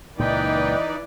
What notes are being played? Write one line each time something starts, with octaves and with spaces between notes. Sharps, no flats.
C#2 A#2 E3 A#3 D#4 B4 D5 G5